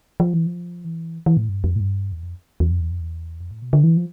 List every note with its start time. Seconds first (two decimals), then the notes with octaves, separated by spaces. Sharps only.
0.20 F3
0.34 E3
0.46 F3
0.85 E3
1.26 E3
1.37 A2
1.49 G2
1.64 F2
1.76 A2
1.80 G2
2.12 E2
2.23 F2
2.60 E2
2.71 F2
2.81 E2
2.91 F2
3.01 E2
3.41 F2
3.51 A2
3.62 B2
3.73 D3
3.84 E3
3.97 F3